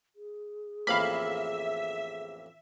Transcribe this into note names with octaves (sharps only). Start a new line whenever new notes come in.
G#4
A1 F2 A#3 E5 F5 B5